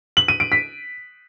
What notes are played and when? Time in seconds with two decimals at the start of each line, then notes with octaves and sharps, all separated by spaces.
0.17 F#7
0.28 D#7
0.40 D7
0.52 B6